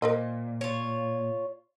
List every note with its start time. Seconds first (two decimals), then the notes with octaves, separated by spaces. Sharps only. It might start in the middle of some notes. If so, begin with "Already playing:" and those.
0.02 A#2 A#4 C5 D#5
0.61 F4 C#5